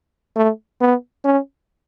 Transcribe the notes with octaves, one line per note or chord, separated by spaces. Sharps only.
A3
B3
C#4